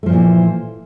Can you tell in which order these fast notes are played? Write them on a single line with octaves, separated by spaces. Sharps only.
A3 F3 A#2 E3